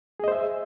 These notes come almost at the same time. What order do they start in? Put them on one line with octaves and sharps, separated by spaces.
G#4 D#5 C5 E5